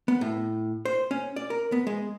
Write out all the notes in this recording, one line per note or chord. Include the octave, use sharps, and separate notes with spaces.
B3
A2
C5
C#4
D5
A#4
B3
G#3